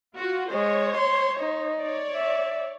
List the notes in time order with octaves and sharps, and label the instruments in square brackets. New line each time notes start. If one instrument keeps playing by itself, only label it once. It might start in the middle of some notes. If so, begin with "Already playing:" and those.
[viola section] F4 F#4
[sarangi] G#3 [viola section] C5 C#5
[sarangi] C6
D#4
[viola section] C#5 D5
[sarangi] E5